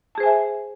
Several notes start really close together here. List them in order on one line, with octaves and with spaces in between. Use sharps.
A5 G#4 C5 G#5 E5